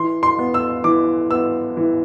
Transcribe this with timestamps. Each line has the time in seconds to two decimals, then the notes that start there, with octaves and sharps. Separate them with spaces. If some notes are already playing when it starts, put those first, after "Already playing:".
Already playing: E3 C6
0.23 C6
0.39 B3
0.54 E6
0.84 E3 D6
1.30 B3 E6
1.77 E3